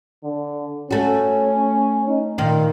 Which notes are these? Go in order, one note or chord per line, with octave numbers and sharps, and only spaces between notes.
D3
A3 C#4 F#4
D#4
A#2 D#3 F5